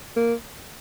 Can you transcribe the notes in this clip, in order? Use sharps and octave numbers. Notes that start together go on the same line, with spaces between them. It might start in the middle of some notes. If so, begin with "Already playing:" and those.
A#3